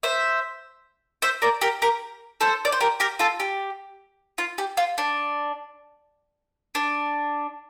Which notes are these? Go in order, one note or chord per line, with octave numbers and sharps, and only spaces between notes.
C5 E5
C5 E5
A#4 D5
G4 A#4
G4 A#4
A4 C5
D5
C5
G4 A#4
G4 A#4
F4 A4
G4
F4
G4
F4
D4
D4